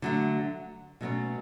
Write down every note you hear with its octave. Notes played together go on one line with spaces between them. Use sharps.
D3 F#3 A3
B2 F#3 A3 C#4